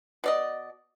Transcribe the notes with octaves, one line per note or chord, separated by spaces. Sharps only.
B2 D5 D#5